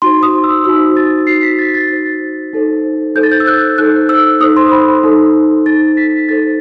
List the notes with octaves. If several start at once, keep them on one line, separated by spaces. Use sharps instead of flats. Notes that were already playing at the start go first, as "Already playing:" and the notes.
D#4 F#4 C5 C6
D#6
E6
D#4 F#4 C5 E6
A6
D#4 F#4 C5 C7
B6
A6
A6
D#4 F#4 C5
D#4 A4 C5
D#4 A4 C5 G6
A6
G6
E6
F#6
D#4 A4 C5 F#6
E6
D#4 A4 C5 D#6
C6
B5
D#4 A4 C5
D#4 A4 C5 A6
B6
D#4 A4 C5 A6